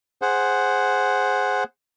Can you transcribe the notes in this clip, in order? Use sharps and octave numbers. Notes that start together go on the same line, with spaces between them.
G#4 C5 F#5